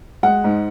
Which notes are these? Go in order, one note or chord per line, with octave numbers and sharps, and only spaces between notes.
G#3 F#5
G#2